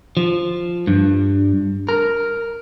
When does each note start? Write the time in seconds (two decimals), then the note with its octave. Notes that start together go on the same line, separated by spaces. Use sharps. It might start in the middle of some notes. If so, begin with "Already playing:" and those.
0.17 F3
0.87 G2
1.89 A#4